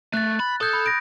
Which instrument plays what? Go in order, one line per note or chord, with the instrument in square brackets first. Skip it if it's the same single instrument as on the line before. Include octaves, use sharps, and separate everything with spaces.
[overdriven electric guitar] A3 [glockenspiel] F#6 A6
[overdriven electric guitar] B5
[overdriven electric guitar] A4 [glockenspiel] D#6 G6 G#6
[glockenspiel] B5
A#6 D7